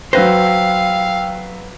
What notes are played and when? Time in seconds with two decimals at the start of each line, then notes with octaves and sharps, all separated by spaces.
0.13 F#3 B4 C5 F5 G5 E6 A#6